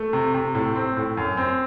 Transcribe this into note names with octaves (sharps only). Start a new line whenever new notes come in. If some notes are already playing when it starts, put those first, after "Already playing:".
Already playing: A3
C3
C3
A2
C4
A2
F#2
C4